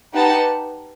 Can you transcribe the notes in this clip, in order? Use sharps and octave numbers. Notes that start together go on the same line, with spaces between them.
D#4 G4 B4 F#5 A5